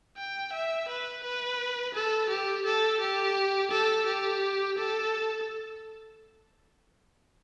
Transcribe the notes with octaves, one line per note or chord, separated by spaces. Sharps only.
G5
E5
B4
B4
A4
G4
A4
G4
A4
G4
A4